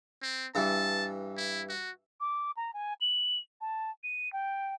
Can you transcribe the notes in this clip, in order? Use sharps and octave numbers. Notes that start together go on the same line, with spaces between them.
C4
G2 E3 A5
E4
F#4
D6
A#5
G#5
F#7
A5
D#7
G5